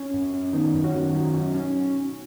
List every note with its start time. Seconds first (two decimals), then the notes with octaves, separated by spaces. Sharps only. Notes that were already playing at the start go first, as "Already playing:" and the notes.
Already playing: C#4
0.14 F#2
0.34 C#4
0.53 D#3 B3 D#4
0.74 F#2
0.84 C#4 F#4
0.94 D#3
1.14 F#3
1.34 C#4
1.54 C#4